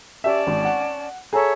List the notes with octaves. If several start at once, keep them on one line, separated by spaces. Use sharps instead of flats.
C#4 G4 D5 E5 A5
G#1
F#5
G#4 A4 C#5 E5 A#5